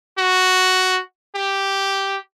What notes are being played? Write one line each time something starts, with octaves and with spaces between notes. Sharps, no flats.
F#4
G4